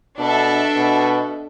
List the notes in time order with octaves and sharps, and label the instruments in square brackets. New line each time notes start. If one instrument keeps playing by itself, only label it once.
[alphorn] B2 [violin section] D4 A4 E5
[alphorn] B2